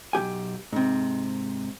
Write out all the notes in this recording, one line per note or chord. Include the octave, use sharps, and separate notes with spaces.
B1 D#3 G4 G#5
G#2 C3